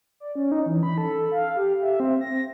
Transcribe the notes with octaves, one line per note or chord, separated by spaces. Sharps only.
D5
C#4
D#4
E3
B5
A4
F5
G4
E5
C4
A#6